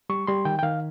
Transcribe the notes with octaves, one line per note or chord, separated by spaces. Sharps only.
G3 C#6
G3 C6
D#3 G5
G5
D#3 F5